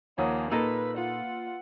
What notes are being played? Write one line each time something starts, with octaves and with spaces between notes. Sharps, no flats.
D#2 F3 A#3 C#5 F#5 G#5 D#6
A#2 A#3 D#4 A4 B4 E6 A#6
F4 F#5